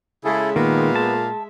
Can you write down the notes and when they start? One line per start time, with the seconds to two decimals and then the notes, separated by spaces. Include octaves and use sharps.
0.24 C#3 G#3 E4 G#4 A4 E5
0.56 A#2 D#3 A#3 B3
0.96 A5